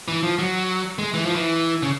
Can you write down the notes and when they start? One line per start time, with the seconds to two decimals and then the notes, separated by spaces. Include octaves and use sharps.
0.08 E3
0.23 F3
0.39 F#3
0.99 G#3
1.14 E3
1.25 F3
1.35 E3
1.83 C#3